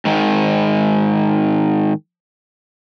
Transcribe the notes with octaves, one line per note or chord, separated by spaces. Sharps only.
G#2 D#3 G#3